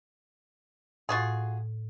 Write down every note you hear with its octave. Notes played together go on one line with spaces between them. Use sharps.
A2 F4 F#4 G#4